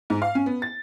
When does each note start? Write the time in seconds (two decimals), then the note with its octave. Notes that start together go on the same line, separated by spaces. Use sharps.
0.10 G#2
0.22 F5
0.35 C#4
0.46 B3
0.62 A6